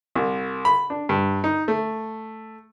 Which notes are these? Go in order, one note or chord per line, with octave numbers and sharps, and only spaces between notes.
C2
B5
D4
G2
D#4
A3